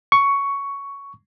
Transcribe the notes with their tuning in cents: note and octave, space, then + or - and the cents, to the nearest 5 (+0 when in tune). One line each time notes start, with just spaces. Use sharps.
C#6 +10